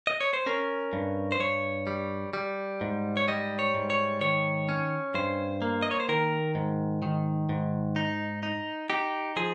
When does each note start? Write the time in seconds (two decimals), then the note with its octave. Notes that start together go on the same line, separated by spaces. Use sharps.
0.07 D#5
0.21 C#5
0.33 C5
0.46 C#4 A#4
0.93 G2
1.32 C5
1.40 G2 C#5
1.87 G3
2.33 G3
2.81 G#2
3.17 C#5
3.28 G3 D#5
3.59 C#5
3.74 G#2
3.90 C#5
4.21 D#3 C#5
4.69 C#4
5.15 G2 C5
5.62 A#3
5.82 D#5
5.91 C#5
6.00 C5
6.09 D#3 A#4
6.55 G#2
7.02 D#3
7.49 G#2
7.96 D#4
8.43 D#4
8.90 D#4 G4
9.37 F3 G#4